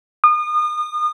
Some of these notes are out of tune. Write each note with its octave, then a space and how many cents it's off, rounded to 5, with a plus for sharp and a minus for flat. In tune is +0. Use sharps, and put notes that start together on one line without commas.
D#6 -35